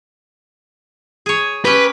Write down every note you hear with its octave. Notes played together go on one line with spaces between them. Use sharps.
G#4 C#5
C#4 G4 B4 G5